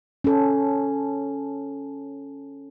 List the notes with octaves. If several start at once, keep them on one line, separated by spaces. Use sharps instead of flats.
C#4 A4